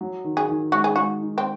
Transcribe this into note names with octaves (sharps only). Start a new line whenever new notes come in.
F#3
D#3
G#4
D#3
G#3 F#4
G#4
G#3 F#4
D#4
C4